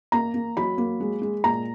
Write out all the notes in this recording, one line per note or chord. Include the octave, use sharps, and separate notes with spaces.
A#3 A#5
A#3
F#3 B5
A#3
G#3
G#3
A#2 A#5